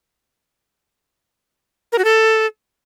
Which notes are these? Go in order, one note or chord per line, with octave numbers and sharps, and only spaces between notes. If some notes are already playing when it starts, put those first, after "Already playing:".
A#4
F#4
A4